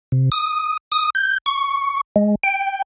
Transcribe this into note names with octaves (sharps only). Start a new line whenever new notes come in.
C3
D#6
D#6
G6
C#6
G#3
G5